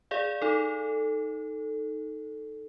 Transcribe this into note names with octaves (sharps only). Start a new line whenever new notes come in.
G#4 D5 F5
D#4 A4